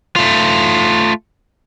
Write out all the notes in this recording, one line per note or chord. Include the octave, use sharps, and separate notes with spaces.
A3 F4